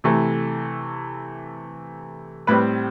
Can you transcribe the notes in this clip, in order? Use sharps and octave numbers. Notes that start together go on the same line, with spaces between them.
C3 E3 A3
A2 G3 C4 B4